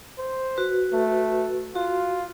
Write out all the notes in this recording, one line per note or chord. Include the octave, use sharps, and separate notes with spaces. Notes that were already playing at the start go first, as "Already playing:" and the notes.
C5
F#4 B4
A3
F4 F#4